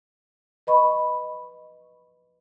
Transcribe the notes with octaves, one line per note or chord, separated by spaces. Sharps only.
B4 D#5 B5 C#6